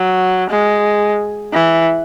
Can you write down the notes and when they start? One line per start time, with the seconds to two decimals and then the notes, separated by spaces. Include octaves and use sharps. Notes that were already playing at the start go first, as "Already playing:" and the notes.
Already playing: F#3
0.50 G#3
1.53 E3